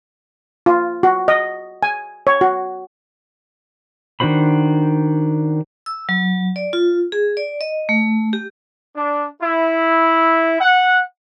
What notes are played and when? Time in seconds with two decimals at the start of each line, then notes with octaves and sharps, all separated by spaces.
0.66 F4
1.03 F#4
1.28 D#5
1.83 G#5
2.27 C#5
2.41 F#4
4.20 D#3 D4 F#4 C5 B5
5.86 E6
6.09 F#3
6.56 D5
6.73 F4
7.12 G#4
7.37 D5
7.61 D#5
7.89 A3
8.33 G4
8.95 D4
9.41 E4
10.60 F#5